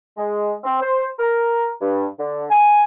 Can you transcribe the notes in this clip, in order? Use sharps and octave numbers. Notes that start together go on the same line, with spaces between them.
G#3
C4
C5
A#4
G2
D3
G#5